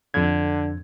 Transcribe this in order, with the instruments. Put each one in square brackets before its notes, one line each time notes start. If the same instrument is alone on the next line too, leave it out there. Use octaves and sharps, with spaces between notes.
[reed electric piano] F2 G#6 [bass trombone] D3